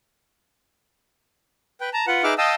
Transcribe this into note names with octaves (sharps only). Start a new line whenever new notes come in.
B4 G5
A5 A#5
F4 B4 F#5
D#4 G#4 B4 E5 D6 F6
D#5 F5 G5 A5 D#6 E6